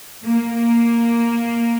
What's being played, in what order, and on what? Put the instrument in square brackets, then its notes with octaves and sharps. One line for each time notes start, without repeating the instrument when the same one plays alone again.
[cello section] A#3